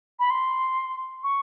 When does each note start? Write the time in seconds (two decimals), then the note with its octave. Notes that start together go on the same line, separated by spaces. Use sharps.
0.19 B5
0.30 C6
1.23 C#6